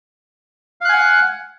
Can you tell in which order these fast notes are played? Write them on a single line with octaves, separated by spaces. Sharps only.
F5 F#6 G#5 F#5